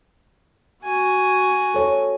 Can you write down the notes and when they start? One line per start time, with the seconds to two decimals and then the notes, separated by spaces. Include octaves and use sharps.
0.83 F#4 G#5
1.74 A4 C#5